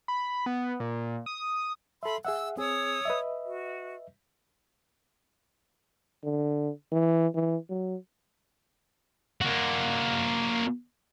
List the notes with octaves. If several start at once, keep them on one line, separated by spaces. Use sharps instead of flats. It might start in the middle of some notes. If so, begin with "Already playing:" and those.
B5
B3
A#2
D#6
A4 E5 B5 C6
G#4 E5 F#5 E6
C4 G#4 C#5 D#6 E6
B4 D#5 E5
F#4
D3
E3
E3
F#3
A#3 F#4